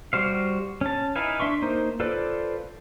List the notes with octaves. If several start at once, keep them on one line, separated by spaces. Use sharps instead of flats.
G3 F#4 C5 F5
C#4 A5
D#4 E4 B4 F5 G#5
D4 E5 C6 C#6
A#3 D#4 C5
F4 A4 B4 C5 D5